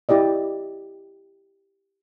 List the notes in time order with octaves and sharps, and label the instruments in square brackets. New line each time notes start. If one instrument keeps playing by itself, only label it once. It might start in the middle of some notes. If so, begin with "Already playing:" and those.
[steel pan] E4 G4 D5 D#5